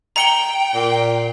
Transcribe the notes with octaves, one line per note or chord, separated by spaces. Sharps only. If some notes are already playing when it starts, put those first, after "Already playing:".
G5 A#5 C#7 G7
A#2